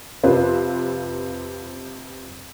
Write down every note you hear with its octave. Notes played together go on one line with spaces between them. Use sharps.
F2 C3 C4 F4 B4